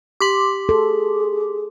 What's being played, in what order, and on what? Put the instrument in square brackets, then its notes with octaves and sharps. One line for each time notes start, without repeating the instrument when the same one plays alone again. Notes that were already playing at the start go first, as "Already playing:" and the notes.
[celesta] G4 B6 F#7 [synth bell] C6 D6
[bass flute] G#4 [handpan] A4